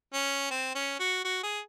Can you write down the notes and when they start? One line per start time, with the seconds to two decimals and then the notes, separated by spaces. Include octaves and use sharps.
0.13 C#4
0.51 C4
0.75 C#4
1.00 F#4
1.25 F#4
1.43 G#4